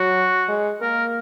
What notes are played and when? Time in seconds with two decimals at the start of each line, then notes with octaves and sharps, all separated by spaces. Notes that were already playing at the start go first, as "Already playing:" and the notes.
Already playing: F#3 F#4
0.49 G#3
0.81 A#3 A#4